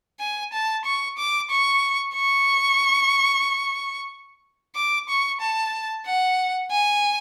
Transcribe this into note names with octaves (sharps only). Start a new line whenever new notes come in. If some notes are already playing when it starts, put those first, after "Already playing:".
G#5
A5
C#6
D6
C#6
C#6
D6
C#6
A5
F#5
G#5